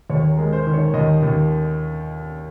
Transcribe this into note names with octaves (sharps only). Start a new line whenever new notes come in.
D#2 C#5
A#4
G#3
C5
D#3
C#5
D#2 D#5
D#2